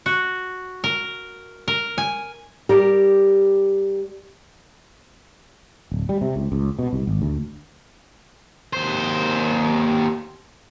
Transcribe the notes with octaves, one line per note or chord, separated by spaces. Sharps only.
F#4
A#4
A#4
G#5
G3 G4 A#4
D1
G3
C3
C#2
C#2
B2
C2
G#1
D2
D#2 C5